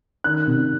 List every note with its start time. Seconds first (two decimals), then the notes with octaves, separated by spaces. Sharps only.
0.24 D#3 F#6
0.47 C3